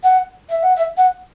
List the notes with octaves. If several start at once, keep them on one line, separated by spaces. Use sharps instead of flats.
F#5
E5
F#5
E5
F#5